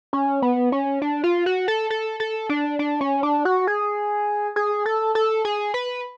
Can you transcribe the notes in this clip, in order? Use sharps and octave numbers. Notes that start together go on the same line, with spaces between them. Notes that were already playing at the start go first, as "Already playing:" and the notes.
C#4
B3
C#4
D4
F4
F#4
A4
A4
A4
D4
D4
C#4
D4
F#4
G#4
G#4
A4
A4
G#4
B4